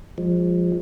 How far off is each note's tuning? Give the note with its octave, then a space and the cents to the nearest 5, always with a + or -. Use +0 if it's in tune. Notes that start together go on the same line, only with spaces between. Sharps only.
F3 +10 G#3 -25